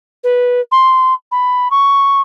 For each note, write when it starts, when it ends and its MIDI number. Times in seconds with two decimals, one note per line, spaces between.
0.23 0.60 71
0.71 1.13 84
1.31 1.70 83
1.70 2.21 85